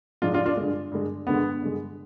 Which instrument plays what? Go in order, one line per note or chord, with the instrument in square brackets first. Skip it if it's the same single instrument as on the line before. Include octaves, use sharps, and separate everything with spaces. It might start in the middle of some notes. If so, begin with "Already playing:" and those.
[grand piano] G#2 F3 G#3 D4 F4
D4 F4
D4 F4
G2 D3 G#3
G2 D3 G#3
G2 D3 G#3 B3
G2 D3 G#3